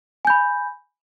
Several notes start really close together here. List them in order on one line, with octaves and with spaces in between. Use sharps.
G#5 G6 B5